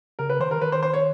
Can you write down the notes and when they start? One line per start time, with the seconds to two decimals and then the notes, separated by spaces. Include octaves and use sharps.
0.19 C#3 A#4
0.30 B4
0.40 D#3 C5
0.51 A#4
0.61 D#3 B4
0.72 C5
0.83 C5
0.93 C#5